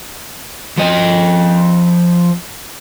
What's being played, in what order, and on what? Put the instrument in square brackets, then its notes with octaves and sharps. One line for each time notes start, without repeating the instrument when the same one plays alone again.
[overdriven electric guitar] F3 D#5